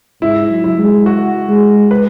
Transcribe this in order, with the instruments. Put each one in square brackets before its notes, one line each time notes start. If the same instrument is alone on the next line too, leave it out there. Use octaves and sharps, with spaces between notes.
[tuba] G#2 [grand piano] E4
[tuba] F#3
[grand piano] E4
[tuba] G#3
[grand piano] F#4
[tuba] G#3
[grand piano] B4